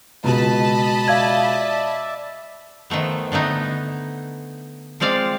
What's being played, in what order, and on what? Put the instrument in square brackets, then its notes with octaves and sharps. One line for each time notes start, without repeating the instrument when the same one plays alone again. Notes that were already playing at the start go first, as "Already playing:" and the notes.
[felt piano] C#2 B2 [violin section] D#5 A5 B5
[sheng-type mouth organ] D5 E5 [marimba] F5 G#6
[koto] D#3 F3 A3 B3
D3 A3 B3 D#4
F3 G#3 C4 D5 F5